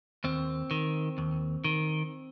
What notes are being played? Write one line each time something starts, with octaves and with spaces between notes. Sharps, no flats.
D#2 C4
D#3
D#2
D#3